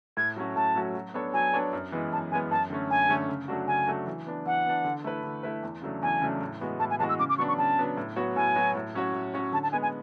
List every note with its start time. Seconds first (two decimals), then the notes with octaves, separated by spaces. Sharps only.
0.17 A2 G#6
0.36 F#3 A3 C#4 F#4
0.56 A2 A5
0.75 F#3 A3 C#4 F#4
0.95 F#3
1.14 B3 D4 A4 C#5
1.34 F#3 G#5
1.53 B3 D4 A4 C#5
1.73 F#2
1.92 E3 G#3 B3
2.12 F#2 A5
2.31 E3 G#3 B3 G#5
2.51 F#2 A5
2.70 D3 A3 C#4
2.90 F#2 G#5
3.09 D3 A3 C#4
3.28 C#3
3.48 F#3 A3 D4 F#4
3.67 C#3 G#5
3.87 F#3 A3 D4 F#4
4.07 E3
4.27 B3 D4
4.46 E3 F#5
4.66 B3 D4
4.85 D3
5.04 A3 E4 B4
5.24 D3
5.43 A3 E4 B4
5.63 E2
5.82 C#3 F#3 A3 D4
6.03 E2 G#5
6.22 C#3 F#3 A3 D4
6.41 A2
6.60 E3 G#3 B3 F#4
6.79 A2 A5
6.90 G#5
6.99 E3 G#3 B3 F#4 A5
7.09 E6
7.19 C#3 D6
7.29 D6
7.38 F#3 B3 D4 C#6
7.48 C#6
7.58 C#3 A5
7.78 F#3 B3 D4
7.97 A2
8.16 F#3 B3 F#4 C#5
8.36 A2 G#5
8.56 F#3 B3 F#4 C#5
8.75 A2
8.95 F#3 C#4 F#4 C#5
9.14 A2
9.34 F#3 C#4 F#4 C#5
9.52 D3 A5
9.63 A5
9.72 G#3 B3 G#5
9.82 G#5